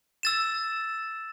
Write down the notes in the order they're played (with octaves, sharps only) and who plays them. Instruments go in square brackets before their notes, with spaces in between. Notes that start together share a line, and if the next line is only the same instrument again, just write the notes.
[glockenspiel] E6 A6 E7